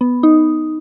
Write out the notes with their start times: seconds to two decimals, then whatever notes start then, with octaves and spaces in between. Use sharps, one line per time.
0.01 B3
0.23 D#4